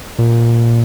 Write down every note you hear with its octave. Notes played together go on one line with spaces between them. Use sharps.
A#2